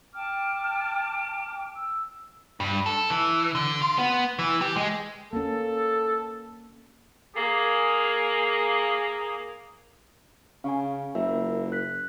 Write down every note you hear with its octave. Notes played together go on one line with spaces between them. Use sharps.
G5 A5 D6 F6
E6
G2
A4
E3
D3
F4
B3
E3
G4
G#3
A#3 C#4 A4
A#3 G#4
C#3 F5 G#5
F#1 F4 A#4 E5
F#6 B6